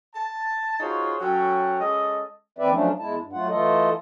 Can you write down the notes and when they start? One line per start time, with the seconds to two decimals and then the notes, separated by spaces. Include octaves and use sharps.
0.14 A5
0.80 D#4 F4 F#4 G#4 C5 C#5
1.20 F#3 C#4 A4 C#5 F#5 G5
1.80 G#3 C#4 A4 D#5
2.58 D#2 E3 C4 B4 D5 E5
2.70 F3 F#3 A3 C#4 D4
2.99 E2 G#3 E4 A5
3.19 G2
3.33 F#3 A3 F4 F#5
3.49 E3 A3 F4 A4 D#5